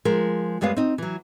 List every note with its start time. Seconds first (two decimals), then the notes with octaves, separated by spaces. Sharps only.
0.05 F3 G#3 A#4
0.61 F#2 G3 G#3 B3 F5
0.76 C4 D#4
0.98 E3 F#3